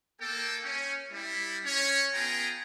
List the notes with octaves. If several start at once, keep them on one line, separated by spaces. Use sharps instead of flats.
A#3 A4 G5
C#4
G3 E4
C#4 C#5
B3 F4 G#4 G5 G#5 A#5